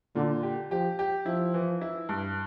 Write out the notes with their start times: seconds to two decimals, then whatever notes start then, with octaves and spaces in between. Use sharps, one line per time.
0.16 A#2 D3
0.43 G4
0.71 F3 G4
0.99 G4
1.26 F3 E4
1.54 E3
1.81 E4
2.09 G2